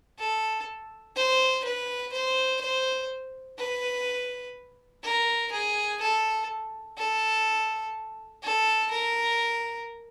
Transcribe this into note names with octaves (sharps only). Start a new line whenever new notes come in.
A4
C5
B4
C5
C5
B4
A#4
G#4
A4
A4
A4
A#4